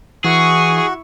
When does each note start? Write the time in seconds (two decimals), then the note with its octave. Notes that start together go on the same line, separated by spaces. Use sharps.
0.25 E3 E4 F#4 G#4 C#6